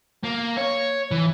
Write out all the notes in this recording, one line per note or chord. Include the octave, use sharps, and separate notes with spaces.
A#3
C#5
E3